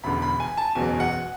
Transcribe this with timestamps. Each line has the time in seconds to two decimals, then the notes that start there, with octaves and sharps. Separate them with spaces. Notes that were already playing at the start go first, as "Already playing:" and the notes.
0.04 E1 E2 D3 B5
0.22 B5
0.40 G#5
0.57 A5
0.75 F#1 E2 B2 F#3 G#5
1.00 F#5